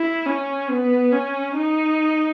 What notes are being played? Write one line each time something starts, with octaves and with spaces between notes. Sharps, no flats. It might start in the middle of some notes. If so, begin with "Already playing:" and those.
Already playing: E4
C#4
B3
C#4
D#4